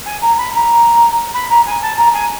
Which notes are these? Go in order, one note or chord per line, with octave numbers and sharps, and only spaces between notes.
G#5
A#5
B5
A#5
B5
A#5
G#5
A5
A#5
G#5